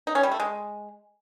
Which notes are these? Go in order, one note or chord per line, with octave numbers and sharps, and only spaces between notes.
D#4
C#4
G3
A3
G#3